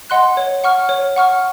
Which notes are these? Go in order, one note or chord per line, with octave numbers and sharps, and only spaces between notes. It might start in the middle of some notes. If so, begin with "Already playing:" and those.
D#5 F#5 C6 F#6
C#5
F#5 C#6 F6
C#5
F#5 C#6 F6